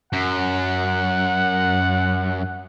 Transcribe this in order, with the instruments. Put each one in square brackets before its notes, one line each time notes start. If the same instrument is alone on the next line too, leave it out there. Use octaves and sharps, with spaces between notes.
[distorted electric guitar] F#2 [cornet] F#5